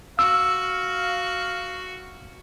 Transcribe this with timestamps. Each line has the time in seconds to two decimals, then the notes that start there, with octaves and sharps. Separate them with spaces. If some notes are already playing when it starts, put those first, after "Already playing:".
0.19 F#4 F5 E6